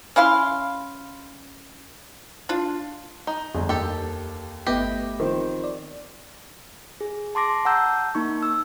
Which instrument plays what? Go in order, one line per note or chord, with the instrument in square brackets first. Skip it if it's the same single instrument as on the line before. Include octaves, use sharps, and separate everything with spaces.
[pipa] C#4 E4 F5 C6
D4 F4
[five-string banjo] D#4
[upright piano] G1 G#4 [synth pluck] F2
[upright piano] D#2 [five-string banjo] G4 A4
[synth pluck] G1 B3 A#6 [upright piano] A3 B4 D#5 [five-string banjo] G4
[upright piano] D#3 F3 C4
[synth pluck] D5
[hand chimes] G#4
A5 C6 D6 A#6
F#5 A5 A#5 E6 G6
A#3 D#4 C#6
E6